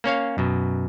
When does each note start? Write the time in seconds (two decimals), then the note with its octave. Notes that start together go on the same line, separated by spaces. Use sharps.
0.04 A#3 C#4 C#5 F5
0.38 F#2 B2